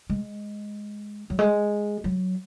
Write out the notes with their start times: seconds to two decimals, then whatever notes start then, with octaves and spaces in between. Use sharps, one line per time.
0.10 G#3
1.30 F#3
1.39 G#3
2.04 F#3